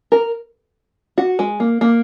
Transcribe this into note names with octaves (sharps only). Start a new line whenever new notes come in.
A#4
F#4
G#3
A#3
A#3